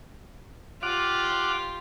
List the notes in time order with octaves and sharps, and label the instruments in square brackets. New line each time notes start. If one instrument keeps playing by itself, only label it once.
[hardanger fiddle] F4 G4 [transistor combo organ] F5 F#5 D6